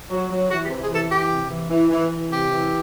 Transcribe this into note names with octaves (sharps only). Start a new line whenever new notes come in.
F#3
F#3
E3 F#4
G4
C3
G#4
E3 A4
E3 G4
C3
E3
E3
E3
E3
C3 G4
E3